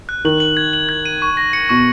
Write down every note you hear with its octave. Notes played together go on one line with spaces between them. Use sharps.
F#6
D#3 F#7
F#7
G#6
F#7
G#6
D#7
C#6
A#6
C#7
B2 C#6